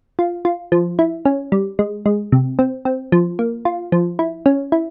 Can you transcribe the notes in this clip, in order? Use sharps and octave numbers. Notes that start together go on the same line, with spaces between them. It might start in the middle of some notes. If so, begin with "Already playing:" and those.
F4
F4
F3
E4
C#4
G3
G#3
G#3
C3
C4
C4
F3
A#3
F4
F3
E4
C#4
E4